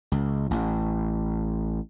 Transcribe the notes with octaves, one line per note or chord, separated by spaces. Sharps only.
C#2
A1